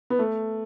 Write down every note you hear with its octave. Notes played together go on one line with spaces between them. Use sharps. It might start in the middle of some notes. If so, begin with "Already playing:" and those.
B3
A3